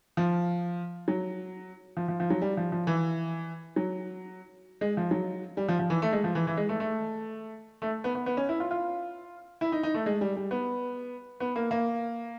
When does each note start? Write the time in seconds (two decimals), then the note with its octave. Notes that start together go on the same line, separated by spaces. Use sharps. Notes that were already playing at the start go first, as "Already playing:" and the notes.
0.17 F3
1.08 F#3
1.97 F3
2.08 F3
2.20 F3
2.30 F#3
2.42 G3
2.57 F3
2.72 F3
2.87 E3
3.76 F#3
4.81 G#3
4.97 F3
5.11 F#3
5.57 G3
5.68 F3
5.79 F3
5.90 E3
6.02 A3
6.13 G#3
6.24 F3
6.35 E3
6.47 E3
6.57 G#3
6.69 A3
6.80 A3
7.82 A3
8.04 B3
8.15 B3
8.26 B3
8.37 C#4
8.49 E4
8.60 F4
8.71 F4
9.61 E4
9.72 D#4
9.83 D#4
9.94 A3
10.06 G#3
10.21 G3
10.36 G3
10.51 B3
11.40 B3
11.56 A#3
11.71 A#3